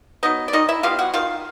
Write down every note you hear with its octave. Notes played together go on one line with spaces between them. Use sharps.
F#3 B3 D#4 D#5
D5
D#3 D#4 D#5
E4 E5
G3 B3 F4 F5
F#4 F#5
D#3 F4 F5